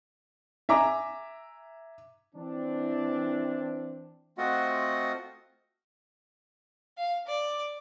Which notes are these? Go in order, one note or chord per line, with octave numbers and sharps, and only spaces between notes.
E5 G#5 A#5 D6
E3 C4 D4
A3 C4 F4 F#4 D#5 F#5
F5
D5